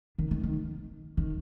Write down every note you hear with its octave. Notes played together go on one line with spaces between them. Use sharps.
D#3
D#3
D#3
D#3